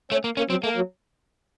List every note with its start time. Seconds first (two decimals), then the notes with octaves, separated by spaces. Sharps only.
0.12 A3 C#4
0.24 A#3
0.37 A#3 C#4
0.50 F#3 C4
0.63 A3 A#3
0.77 F#3